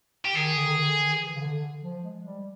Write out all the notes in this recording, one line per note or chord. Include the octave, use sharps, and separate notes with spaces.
G4
D#3 G#4
D3
D#3
D3
D#3
E3
C#3
D3
F3
G#3
G3